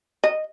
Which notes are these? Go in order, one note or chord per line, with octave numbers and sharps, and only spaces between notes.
D#5